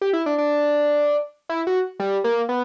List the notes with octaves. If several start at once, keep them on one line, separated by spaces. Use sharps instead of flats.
G4
E4
D4
D4
E4
F#4
G3
A#3
B3